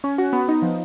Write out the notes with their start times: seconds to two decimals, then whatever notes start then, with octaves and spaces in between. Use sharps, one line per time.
0.04 C#4
0.18 F#4
0.33 B3
0.48 D#4
0.62 F3